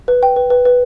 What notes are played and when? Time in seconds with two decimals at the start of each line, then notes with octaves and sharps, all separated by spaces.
0.08 B4
0.23 G5
0.36 B4
0.50 B4
0.65 B4